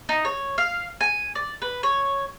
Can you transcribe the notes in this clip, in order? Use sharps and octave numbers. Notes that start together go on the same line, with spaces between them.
D#4
C#5
F5
G#5
D5
B4
C#5